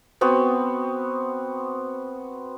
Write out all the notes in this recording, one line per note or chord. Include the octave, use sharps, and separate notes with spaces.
B3 C4 F#4